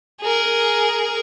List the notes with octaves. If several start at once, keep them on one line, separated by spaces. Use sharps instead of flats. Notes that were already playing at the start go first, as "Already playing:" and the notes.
G#4 A#4